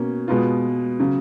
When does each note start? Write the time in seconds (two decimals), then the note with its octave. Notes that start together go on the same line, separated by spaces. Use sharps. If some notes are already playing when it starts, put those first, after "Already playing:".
Already playing: B2 A#3 C#4
0.28 B2 G#3 B3 F4
1.00 C#3 F#3